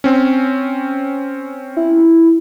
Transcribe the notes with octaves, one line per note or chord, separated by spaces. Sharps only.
C4 C#4
E4